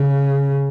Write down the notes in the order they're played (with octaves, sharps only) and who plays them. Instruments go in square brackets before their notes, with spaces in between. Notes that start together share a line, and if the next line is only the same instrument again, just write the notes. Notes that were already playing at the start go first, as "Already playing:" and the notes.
Already playing: [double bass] C#3